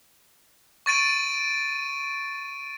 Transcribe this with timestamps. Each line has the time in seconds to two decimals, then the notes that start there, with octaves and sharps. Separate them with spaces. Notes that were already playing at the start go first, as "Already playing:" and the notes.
0.86 C#6 A6 D7 D#7